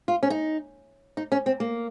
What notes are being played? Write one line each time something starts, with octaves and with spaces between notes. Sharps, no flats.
F4
C#4
D#4
D#4
C#4
C4
A#3